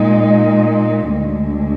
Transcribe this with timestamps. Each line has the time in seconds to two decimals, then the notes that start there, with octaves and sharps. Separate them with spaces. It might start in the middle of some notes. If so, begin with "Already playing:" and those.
Already playing: A#2 G#3 D#4
1.11 D2 D3 G#3